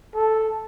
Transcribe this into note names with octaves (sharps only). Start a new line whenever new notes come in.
A4